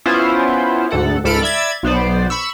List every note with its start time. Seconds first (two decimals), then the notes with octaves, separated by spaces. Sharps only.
0.06 B3 C#4 E4 F4 C5
0.91 D2 G#2 A4 F#5
1.24 C#2 G#2 A4 B5 F6 D7
1.42 D5 E5 B5 G#6 A6
1.83 B1 B3 C5 D5
2.30 B5 C#6 E6